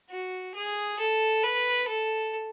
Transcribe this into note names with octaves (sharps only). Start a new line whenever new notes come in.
F#4
G#4
A4
B4
A4